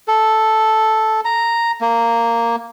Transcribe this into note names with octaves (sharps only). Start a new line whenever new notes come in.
A4
A#5
A#3